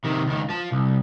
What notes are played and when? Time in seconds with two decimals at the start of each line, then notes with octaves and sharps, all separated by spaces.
0.04 C3 D#3
0.27 C#2 D#3
0.50 F3 A5
0.72 C2